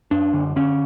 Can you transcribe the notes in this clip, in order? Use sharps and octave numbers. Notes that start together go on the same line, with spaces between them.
F#2 D4
D3
D3 C#4